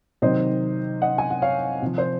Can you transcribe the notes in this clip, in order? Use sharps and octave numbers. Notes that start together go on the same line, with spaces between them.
C3 D#3 F#3 C5 D#5
D#5 F#5
G#5
F#5
C#5 F5
C3 F3
C5